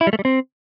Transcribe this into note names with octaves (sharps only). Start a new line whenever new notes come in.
E4
G3
A3
G3
C4